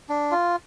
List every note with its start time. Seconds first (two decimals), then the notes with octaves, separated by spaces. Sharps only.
0.09 D4
0.31 F4